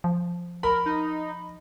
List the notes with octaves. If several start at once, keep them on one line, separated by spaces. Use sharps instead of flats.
F3
A#4 B5
D#4